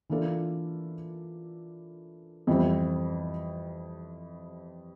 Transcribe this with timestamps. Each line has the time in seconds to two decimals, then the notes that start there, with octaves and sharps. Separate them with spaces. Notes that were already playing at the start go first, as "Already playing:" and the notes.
0.10 E3 A#3 D4 F4 A4
2.47 F2 E3 G3 C4